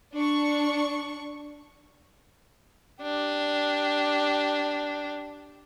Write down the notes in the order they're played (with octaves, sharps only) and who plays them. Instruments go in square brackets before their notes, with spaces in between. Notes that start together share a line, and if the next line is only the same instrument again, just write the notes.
[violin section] D4 C#6
[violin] D4 G4